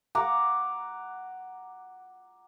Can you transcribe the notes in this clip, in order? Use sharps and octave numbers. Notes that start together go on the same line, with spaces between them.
F#5 A#5 D6